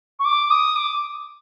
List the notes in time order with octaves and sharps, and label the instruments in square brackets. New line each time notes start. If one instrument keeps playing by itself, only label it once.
[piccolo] C#6
D6
D#6
D6